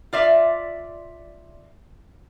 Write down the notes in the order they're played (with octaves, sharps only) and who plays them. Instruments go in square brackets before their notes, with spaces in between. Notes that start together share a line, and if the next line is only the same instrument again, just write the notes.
[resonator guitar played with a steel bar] F4 D5 E5